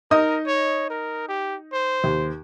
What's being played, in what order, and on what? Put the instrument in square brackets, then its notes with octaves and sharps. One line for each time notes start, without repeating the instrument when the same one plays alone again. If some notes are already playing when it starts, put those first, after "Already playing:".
[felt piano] D#4 D#5 D#6 [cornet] A#4
[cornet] C#5
A#4
G4
C5
[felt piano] D#2